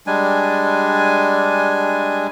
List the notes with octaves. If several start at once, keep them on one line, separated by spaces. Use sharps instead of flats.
G3 G#3 D4 G#5